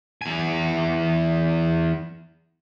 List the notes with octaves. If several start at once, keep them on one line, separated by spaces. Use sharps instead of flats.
E2 G#5